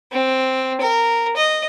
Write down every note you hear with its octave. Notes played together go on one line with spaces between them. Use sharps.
C4
A#4
D#5